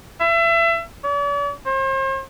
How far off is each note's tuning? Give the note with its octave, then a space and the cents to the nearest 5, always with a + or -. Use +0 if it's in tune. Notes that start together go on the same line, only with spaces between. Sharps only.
E5 +30
D5 -45
C5 +40